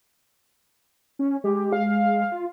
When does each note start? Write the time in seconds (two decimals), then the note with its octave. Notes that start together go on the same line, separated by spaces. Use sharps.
1.19 C#4
1.44 G#3 G4
1.73 F5
2.32 F4